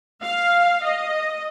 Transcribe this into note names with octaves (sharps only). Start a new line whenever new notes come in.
F5
D#5